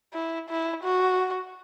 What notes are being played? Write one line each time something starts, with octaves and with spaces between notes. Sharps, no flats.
E4
E4
F#4